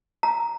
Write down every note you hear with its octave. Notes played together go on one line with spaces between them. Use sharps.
A#5